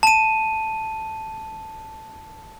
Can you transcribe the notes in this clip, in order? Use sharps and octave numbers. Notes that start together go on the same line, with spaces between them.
A5 D#7